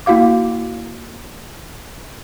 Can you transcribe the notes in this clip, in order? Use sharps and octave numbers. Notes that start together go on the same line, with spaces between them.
A#3 E4 F#4 F5 D6